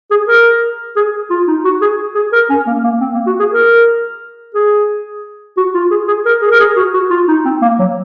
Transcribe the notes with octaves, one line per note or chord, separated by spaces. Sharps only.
G#4
A#4
G#4
F4
D#4
F#4
G#4
G#4
A#4
C#4
A#3
A#3
C4
A#3
F#4
G#4
A#4
G#4
F#4
F4
G#4
G#4
A#4
G#4
A#4
G#4
F#4
F#4
F4
D#4
C4
A#3
F#3